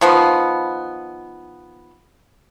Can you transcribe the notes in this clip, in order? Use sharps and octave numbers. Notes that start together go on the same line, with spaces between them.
D#3 F3 B3